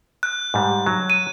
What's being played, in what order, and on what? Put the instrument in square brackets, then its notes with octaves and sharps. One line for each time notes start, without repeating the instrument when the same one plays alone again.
[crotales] F#6
[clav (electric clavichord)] G#2 G3
F#3
[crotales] D#7